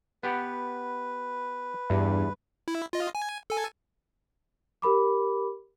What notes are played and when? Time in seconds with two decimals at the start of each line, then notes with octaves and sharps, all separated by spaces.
0.23 B3 G4 B4 F#5
1.90 E2 G2
2.68 E4
2.93 F4 D#5
3.15 G#5
3.50 A4 G#5
4.82 G4 A#4 B5 D6